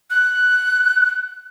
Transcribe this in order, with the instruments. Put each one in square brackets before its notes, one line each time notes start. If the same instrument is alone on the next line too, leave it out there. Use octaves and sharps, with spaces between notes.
[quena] F#6